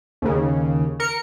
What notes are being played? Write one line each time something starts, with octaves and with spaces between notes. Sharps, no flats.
D#2 C#3
A#4 C#7